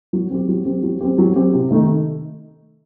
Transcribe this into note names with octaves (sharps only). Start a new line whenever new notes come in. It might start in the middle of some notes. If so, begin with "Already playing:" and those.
F#3
C4 G4
F#3
C4 G4
F#3
C4 G4
F#3
C4 G4
C3
D#3 A3 D#4